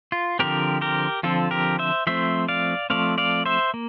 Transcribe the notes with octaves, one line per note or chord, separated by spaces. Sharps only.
F4
D3 F3 C4 G4 A#4
G4 A#4
D3 F3 C4 F4 A4
G4 A#4
C5 E5
F3 A3 C4 C5 E5
D5 F5
F3 A3 C4 D5 F5
D5 F5
C5 E5
A#3